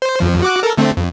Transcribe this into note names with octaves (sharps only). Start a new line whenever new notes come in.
C5
F2 F3
F#4 D6 F#6
A4 A#4
D3 A3 C4
F2